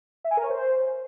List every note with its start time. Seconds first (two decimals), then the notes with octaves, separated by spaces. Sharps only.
0.24 E5
0.31 G#5
0.37 A#4
0.43 C#5
0.50 C5